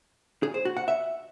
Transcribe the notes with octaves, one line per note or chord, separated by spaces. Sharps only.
G#4
C5
F#4
F#5
E5